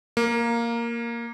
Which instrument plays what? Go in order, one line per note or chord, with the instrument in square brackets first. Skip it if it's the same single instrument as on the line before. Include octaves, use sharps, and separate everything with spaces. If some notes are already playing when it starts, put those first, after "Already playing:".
[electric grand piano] A#3